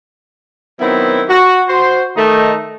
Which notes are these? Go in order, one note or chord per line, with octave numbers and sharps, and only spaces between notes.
D#3 F#3 B3 C4 E4
F#4
F#4 C5
D#3 A3 D#4